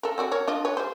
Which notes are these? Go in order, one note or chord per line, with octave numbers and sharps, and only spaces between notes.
A4 A#4
C4 F#4 D5
A#4 C#5
D4 F4 D#5
B4 C#5
G3 C5